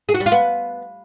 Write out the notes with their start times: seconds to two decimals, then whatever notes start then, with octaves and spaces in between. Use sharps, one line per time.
0.09 G#4
0.14 F#4
0.20 G3
0.26 F4
0.32 B3